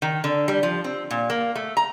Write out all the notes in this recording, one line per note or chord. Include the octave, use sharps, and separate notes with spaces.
D#3
D3
G3
F3
C4
A#2
A#3
A3
A#5